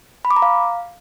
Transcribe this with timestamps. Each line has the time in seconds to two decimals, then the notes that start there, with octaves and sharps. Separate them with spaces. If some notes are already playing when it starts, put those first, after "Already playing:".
0.25 B5
0.31 D6
0.36 A#5
0.42 F5